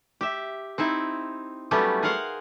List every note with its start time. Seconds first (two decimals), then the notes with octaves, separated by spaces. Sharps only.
0.21 G4 E5
0.78 C4 D#4 E4
1.71 F#3 G3 A3 B3 C#4 G4
2.03 G#4 A#4 C5 F5 F#5